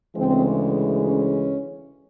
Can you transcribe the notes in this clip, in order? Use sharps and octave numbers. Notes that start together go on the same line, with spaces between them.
D2 C#3 E3 G#3 C4
C#4